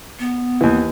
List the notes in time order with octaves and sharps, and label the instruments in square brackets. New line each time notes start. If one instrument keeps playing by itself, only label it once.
[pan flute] B3
[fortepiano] D#2 E3